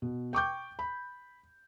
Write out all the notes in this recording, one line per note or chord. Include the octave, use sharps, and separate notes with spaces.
B2
G5 C#6 D6 G6
B5